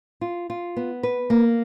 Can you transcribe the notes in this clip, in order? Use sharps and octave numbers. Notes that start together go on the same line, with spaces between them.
F4
F4
B3
B4
A#3